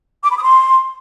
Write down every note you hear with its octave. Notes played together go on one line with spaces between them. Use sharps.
D6
B5
D#6
C6